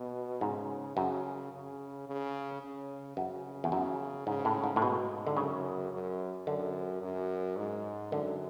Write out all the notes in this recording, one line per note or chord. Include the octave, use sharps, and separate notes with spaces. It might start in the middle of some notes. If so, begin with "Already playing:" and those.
Already playing: B2
G#2 C#3
F#2 C#3
C#3
C#3
C#3
F#2 C#3
E2
F#2 C#3
G#2 C#3
A2
G#2
A2
G#2 B2
D3
F#2 C#3
F#2
F#2 D3
F#2
G#2
F#2 D3